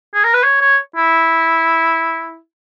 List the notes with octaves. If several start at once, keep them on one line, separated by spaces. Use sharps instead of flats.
G#4
A#4
B4
C#5
C#5
E4